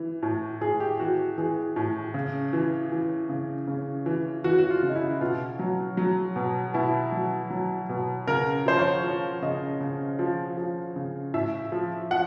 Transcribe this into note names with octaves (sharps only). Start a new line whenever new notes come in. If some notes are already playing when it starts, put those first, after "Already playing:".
Already playing: E3
A2
A2 G#4
G4
E3 F#4
E3 G#4
A2
C#3
E3
E3
C#3
C#3
E3
E3 F#4
F#4
F4
C#3
D#4
E4
B2 F4
F#3
F#3
B2
B2 E4
F#3
F#3
B2
C#3 A#4
F3 C5
C#5
F3
C#3 D#5
C#3
F3
F3
C#3
A2 E5
F3
F3 F#5